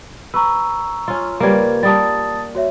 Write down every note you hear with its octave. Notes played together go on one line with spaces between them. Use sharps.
B4 A#5 C#6 E6
C#4 F4
C#3 G3 A#3 A#4 B4 G#6
G3 A#3 A5 D#6 A6
F#4 C#5 E5